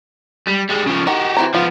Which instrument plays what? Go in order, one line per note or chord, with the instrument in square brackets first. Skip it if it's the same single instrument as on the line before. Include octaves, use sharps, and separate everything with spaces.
[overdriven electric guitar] G3
G3 G#3
C#3 F3
[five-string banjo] D#3 [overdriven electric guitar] F#4 G4
[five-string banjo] E3 C4 A#5
[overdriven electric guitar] F3 B3 [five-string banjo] F4